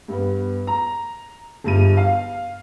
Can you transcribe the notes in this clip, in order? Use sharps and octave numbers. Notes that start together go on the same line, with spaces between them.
G2 B3
A#5
G1 G2 D#7
F5